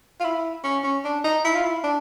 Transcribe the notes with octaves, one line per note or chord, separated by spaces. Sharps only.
F4
E4
C#4
C#4
D4
D#4
E4
F4
E4
D4